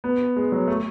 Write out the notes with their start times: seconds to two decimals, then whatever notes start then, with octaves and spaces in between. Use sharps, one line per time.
0.04 B3
0.36 G#3
0.52 F#3
0.68 A3